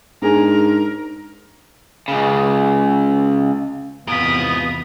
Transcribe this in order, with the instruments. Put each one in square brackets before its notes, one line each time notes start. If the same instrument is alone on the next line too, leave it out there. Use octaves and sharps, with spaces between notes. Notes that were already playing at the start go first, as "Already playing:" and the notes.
[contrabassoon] G#2 [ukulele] D4 G#4 [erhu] A#4
[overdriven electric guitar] C#2 C#3
[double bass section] E2 C3 B3 [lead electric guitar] G#2 F4 [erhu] D#6 [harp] B6 D7